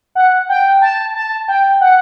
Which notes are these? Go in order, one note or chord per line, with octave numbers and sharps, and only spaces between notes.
F#5
G5
A5
A5
G5
F#5